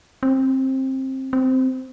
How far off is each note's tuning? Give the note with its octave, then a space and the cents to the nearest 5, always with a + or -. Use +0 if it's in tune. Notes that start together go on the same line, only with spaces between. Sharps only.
C4 +20
C4 -10